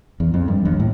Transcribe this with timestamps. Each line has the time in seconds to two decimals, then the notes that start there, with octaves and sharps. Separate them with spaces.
0.20 E2
0.34 F2
0.48 G2
0.65 D#2
0.80 A2